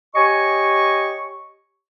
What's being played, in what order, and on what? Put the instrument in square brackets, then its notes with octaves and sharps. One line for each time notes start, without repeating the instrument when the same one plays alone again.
[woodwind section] G4 C#5 D#5 G#5 C#6